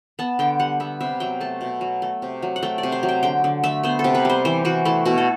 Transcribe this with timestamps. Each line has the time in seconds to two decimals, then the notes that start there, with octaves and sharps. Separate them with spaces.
0.19 B3 A5
0.39 D3 G5
0.59 G3 F#5
0.80 B3 E5
1.01 C3 E5
1.20 F#3 G5
1.40 A3 A5
1.61 B2
1.81 F#3
2.02 A3
2.22 C3
2.42 F#3
2.56 F#5
2.63 A3 G5
2.78 D5
2.83 C3
2.92 C5
3.03 F#3
3.09 G5
3.23 D3 G5
3.44 D3
3.63 A3 E5
3.83 B3 C5
3.99 A4
4.04 C3
4.15 B4
4.25 G3 C5
4.45 E3 C5
4.65 E3 F#4
4.85 A3 E4
5.06 B2 F#4
5.18 A4